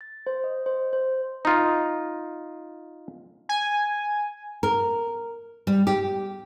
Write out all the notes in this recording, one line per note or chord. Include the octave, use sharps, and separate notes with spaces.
A6
C5
D#5
C5
C5
D#4 F4
G#5
A#4
G3
G4